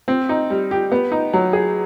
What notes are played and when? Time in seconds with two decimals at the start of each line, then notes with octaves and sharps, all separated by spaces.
0.08 C4
0.29 D#4
0.50 G3
0.71 G4
0.92 B3
1.12 D#4
1.33 F#3
1.53 G#4